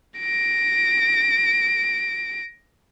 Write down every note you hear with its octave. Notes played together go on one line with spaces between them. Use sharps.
A#6 D7